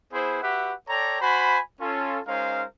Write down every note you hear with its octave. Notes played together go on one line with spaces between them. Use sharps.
B3 E4 G#4 B4 C5
F#4 G4 B4 E5 F#5
A4 C#5 D5 G5 A#5
F#4 C5 G#5 B5
C#4 F4 A4
G#3 C#4 D#4 A#4 C5 F5